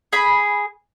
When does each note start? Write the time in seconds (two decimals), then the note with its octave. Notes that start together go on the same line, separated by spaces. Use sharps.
0.13 G#4 B5